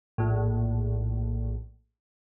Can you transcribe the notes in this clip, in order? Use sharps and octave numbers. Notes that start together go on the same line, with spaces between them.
A#1 A2